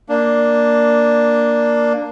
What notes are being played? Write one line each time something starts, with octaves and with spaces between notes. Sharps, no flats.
A#3 D4